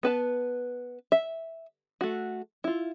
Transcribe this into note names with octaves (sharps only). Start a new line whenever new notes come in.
B3 B4 A5
E5
A3 F#4
E4 F4